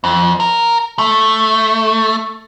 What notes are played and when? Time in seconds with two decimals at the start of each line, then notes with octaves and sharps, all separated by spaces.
0.04 F2
0.40 A#4
0.99 A3